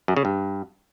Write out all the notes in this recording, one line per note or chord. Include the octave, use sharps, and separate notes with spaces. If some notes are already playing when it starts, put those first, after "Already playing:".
F#2
C#3
G2